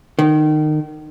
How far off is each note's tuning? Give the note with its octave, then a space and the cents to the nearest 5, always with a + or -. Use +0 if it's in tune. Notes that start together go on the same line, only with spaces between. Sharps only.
D#3 -25